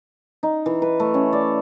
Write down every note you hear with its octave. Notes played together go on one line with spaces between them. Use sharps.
D#4
E3
B4
A3
C#4
D5